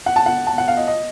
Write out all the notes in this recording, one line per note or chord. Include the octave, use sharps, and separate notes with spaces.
F#5
A5
F#5
A5
F#5
F5
D#5
D#5